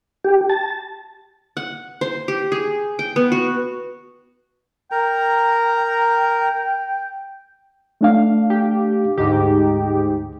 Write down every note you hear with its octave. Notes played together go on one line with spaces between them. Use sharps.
G4
A5
F#5
C5
G4
G#4
G5
B3
F#4
A#4 G5 A#5
A3 D4 F5
G4
D2 G#2 D#4 G4